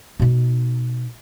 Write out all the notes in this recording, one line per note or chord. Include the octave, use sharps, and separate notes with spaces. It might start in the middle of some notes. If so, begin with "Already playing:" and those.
B2 D#4